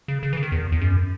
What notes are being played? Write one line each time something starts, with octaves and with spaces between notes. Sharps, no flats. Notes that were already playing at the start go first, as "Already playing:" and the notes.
C#3
C#3
E3
C#3
D#3
E2
E2
F#2